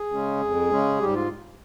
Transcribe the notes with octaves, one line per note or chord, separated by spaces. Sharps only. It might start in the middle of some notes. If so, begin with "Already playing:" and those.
Already playing: G#4
C#3 G#3 C#4
F2
C#3 G#3 C#4
G#2 G3 G4
F4